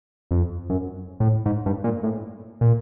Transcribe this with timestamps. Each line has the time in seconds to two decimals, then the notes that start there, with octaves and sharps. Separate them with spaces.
0.31 F2
0.70 F#2
1.20 A2
1.46 G#2
1.66 G2
1.84 A#2
2.03 A2
2.61 A#2